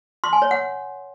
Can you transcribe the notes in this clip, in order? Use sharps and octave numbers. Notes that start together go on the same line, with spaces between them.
C6
G#5
C#5
F#5